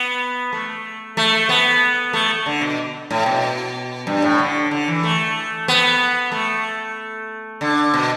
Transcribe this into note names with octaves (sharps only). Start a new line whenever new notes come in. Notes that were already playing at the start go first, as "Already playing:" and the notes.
Already playing: B3
A3
A3
B3
A3
D3
B2
A2
B2
G2
A2
D3
D3
E3
A3
B3
A3
D3
B2